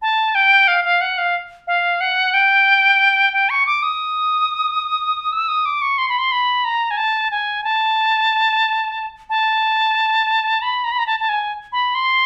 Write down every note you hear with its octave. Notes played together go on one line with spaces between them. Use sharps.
A5
G5
F5
F5
F#5
F5
F5
F#5
G5
G5
C#6
D6
D#6
E6
D#6
D6
C#6
C6
B5
C6
B5
A#5
G#5
A5
G#5
A5
A5
B5
A#5
B5
A#5
A5
A5
G#5
B5
C6